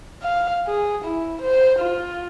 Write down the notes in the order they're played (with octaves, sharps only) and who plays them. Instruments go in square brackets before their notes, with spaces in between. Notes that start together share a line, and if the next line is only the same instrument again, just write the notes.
[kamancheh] F5
G#4
E4
C5
F4